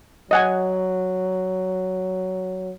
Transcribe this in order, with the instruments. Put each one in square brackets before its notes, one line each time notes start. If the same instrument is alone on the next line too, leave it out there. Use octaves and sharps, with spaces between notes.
[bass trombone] F#3 [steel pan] D#5 F#5 G#5